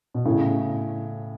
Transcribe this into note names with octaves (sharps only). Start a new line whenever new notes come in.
B2
A2 C#3